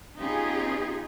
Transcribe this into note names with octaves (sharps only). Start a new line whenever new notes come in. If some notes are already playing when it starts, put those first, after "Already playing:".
B3 C#4 D#4 F4 G4 G#4